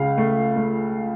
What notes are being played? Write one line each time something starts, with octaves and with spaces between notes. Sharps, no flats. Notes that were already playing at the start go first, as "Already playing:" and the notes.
Already playing: C#2 C#3 F5
A3
A3